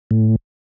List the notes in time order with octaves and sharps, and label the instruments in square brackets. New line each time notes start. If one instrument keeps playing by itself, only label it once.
[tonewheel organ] A2